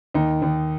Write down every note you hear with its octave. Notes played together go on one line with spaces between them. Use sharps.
D#2 D#4
D#2